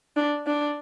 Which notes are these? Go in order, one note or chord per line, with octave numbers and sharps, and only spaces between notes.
D4
D4